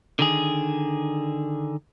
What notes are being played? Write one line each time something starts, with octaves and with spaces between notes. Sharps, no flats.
D3 D#3 G#4